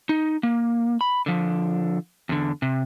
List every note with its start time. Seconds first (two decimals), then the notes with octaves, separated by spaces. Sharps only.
0.09 D#4
0.43 A#3
1.01 B5
1.26 D3 F3
2.29 E2 D3
2.62 C3